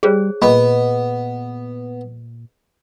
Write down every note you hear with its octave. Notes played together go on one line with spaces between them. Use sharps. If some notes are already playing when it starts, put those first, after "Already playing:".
G3 G#4 C5 C#5
A#2 B3 D#5 B5